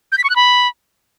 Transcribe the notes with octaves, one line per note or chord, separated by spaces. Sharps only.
G6
B6
C#6
F#6
B5